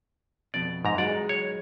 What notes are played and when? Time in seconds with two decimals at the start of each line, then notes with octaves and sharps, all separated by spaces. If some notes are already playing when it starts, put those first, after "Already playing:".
0.54 F2 B2 D5
0.85 G#2 A#5
0.98 F#3 G#3 D#4 D5
1.29 C#5